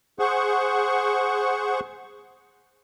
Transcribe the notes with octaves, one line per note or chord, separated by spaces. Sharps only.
G#4 C5 F#5 C#6